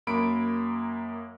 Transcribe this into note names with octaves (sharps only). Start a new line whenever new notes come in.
F#2 A#3 B5 D7